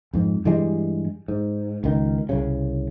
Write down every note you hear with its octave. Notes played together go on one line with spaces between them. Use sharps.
F2 G#2
G2 E3 G3 G#3
G#2
C#2 D#3
C2 C#3